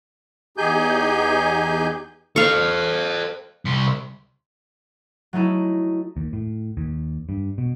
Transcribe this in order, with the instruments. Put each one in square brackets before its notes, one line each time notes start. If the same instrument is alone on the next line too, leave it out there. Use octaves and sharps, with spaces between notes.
[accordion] E2 D#4 G4 G#4 G#5 G6
[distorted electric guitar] A4 C5 [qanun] F5 C#6
[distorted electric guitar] C2 C6
[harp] F#3 A3 D#4 E4
[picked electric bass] D#2
A2
D#2
G2
B2